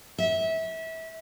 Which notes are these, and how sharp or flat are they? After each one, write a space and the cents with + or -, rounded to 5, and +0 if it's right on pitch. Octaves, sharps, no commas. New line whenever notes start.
E5 -25